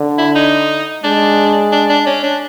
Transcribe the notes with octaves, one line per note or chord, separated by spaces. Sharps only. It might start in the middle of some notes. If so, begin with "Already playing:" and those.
Already playing: D3
E4
D#4
G#3 D4
D4
D4
C#4
D4